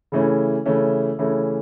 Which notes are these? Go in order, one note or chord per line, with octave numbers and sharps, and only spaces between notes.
C#3 E3 A3 C#4
C#3 E3 A3 C#4
C#3 E3 A3 C#4